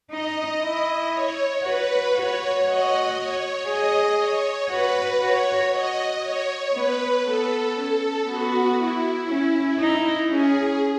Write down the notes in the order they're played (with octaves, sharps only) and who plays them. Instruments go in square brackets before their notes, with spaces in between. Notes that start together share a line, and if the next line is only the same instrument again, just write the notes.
[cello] D#4 [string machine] D#5
[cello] E4
[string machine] C#5
[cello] F#4 [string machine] B4
[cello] F#4 [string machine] C#5
[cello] F#4 [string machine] D#5
[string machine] C#5
[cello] G#4 [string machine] D#5
[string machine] C#5
[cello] F#4 [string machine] B4
[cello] F#4 [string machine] C#5
[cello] F#4 [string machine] D#5
[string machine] C#5
[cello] B3 [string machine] B4
[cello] B3 [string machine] A4
[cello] C#4 [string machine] A4
[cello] B3 [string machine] F#4
[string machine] E4
[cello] C#4
D#4
[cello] C#4 [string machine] G#4